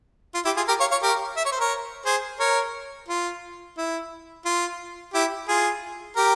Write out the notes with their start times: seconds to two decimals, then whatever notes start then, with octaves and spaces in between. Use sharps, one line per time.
0.34 F4
0.45 E4 G4
0.57 F4 G#4
0.68 G4 A#4
0.80 C#5 F5
0.91 C#5 F5
1.02 G4 A#4
1.37 E5
1.45 C#5
1.52 C5
1.59 A#4 C#5
2.05 G#4 C5
2.40 A#4 C#5
3.09 F4
3.77 E4
4.45 F4
5.13 E4 G4
5.48 F4 G#4
6.16 G4 A#4